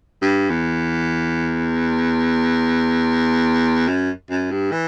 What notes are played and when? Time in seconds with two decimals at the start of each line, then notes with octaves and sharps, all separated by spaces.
0.22 G2
0.50 E2
3.88 F#2
4.30 F#2
4.51 G2
4.72 E3